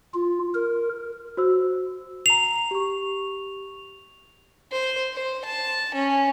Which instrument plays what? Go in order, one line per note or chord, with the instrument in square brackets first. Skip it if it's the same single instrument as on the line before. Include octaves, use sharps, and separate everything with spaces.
[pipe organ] F4
A#4
[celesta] F#4 C5 E6
[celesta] A#5 C7 [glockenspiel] F7
[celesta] G4 C#6
[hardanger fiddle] C5
C5
A5
C#4